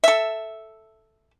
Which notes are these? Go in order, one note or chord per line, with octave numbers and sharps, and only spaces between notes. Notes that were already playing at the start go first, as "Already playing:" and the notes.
A4 E5